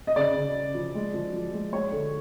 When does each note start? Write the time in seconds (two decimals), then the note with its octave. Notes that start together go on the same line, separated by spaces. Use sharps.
0.07 D#5
0.16 C#3 D5
0.35 C#3
0.55 C#3
0.75 F3
0.95 G#3
1.14 F3
1.33 F3
1.53 G#3
1.72 G#3 C#5
1.92 D3